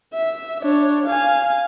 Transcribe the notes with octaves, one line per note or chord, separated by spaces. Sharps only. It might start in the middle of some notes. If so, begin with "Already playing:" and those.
E5
D4 C#5
F5 G#5